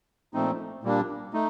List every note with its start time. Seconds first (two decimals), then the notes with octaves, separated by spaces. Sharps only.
0.34 A#2 F3 A3 C4 D#4
0.83 A#2 G3 A#3 D4
1.33 A3 D#4